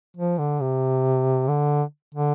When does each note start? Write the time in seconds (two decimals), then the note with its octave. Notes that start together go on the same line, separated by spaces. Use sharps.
0.17 F3
0.39 D3
0.61 C3
1.48 D3
2.15 D3